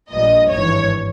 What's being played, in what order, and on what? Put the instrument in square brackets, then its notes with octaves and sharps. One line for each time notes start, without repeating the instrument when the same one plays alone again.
[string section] A#1 A#2 G3 D#5
G#1 G2 E3 C#5